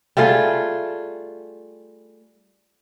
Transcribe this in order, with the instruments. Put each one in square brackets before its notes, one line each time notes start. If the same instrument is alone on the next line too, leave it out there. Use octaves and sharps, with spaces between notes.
[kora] G3 A3 F4 G#4